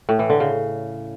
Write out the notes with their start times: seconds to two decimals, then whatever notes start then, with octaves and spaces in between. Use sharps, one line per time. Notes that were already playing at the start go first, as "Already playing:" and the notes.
0.09 A2
0.19 E3
0.30 D3
0.40 C#3